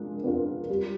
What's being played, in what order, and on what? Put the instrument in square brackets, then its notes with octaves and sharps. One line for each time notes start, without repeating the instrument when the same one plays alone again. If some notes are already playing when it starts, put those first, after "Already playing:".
Already playing: [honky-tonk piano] G#3 D4 F4 A#4
B3 D4 F4 A#4
G3